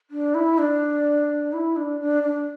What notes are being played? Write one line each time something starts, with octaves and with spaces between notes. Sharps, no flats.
D4
E4
D4
E4
D4
D4
D4